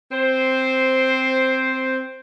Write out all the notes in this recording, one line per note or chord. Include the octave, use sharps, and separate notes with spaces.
C4 C5